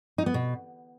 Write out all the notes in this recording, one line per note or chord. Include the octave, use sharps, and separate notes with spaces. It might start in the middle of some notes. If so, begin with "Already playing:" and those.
D#4
B3
B2